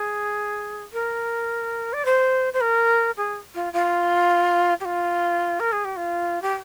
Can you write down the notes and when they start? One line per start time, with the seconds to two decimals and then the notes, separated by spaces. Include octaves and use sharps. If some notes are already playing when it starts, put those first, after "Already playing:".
Already playing: G#4
0.93 A#4
1.93 D5
2.05 C5
2.53 C5
2.61 A#4
3.17 G#4
3.54 F4
3.73 F4
4.80 G4
4.85 F4
5.60 A#4
5.72 G#4
5.85 G4
5.96 F4
6.42 G4